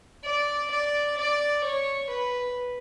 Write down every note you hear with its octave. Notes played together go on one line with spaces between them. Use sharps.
D5
D5
D5
C#5
B4